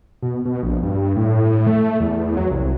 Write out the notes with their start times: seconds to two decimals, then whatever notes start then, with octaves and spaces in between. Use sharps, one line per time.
0.22 B2
0.45 B2
0.63 A#1
0.83 G2
1.16 A2
1.67 A3
2.00 E2
2.37 F#3
2.51 C2